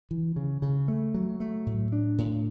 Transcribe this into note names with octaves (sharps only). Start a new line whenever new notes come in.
E3
C#3
C#3
A3
F#3
A3
A2
D4
A2